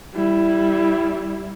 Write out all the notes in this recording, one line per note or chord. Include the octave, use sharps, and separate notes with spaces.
G3 E4